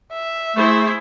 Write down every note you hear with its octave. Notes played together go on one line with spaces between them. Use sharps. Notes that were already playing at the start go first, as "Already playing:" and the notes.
E5
A3 E4 G#4 C5